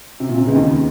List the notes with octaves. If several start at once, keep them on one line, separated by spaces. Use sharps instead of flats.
C3
A#2
C3
C#2 C#3
D#2 D#3